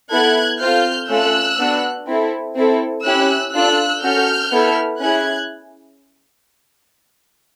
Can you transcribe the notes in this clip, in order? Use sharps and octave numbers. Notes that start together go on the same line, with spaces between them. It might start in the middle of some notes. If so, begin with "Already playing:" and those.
B3 E4 A4 F#6 G#6
C4 F4 A4 F6 G6
A3 C#4 F4 A4 E6 F#6
B3 D4 F#4
C4 E4 A4
C4 E4 A4
C#4 E4 G4 E6 F#6
D4 F4 A4 E6 F#6
C#4 F#4 A4 F6 G6
B3 E4 A4
C#4 E4 G#4 F#6 G#6